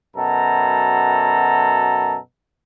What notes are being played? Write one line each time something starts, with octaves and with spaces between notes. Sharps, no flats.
F#2 B2 A4 A#5